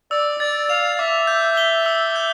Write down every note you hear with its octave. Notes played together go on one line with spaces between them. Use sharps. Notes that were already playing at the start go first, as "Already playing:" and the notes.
D5 E6
D5 A6
F5 F7
E5 D6
G6
G7
E6
G6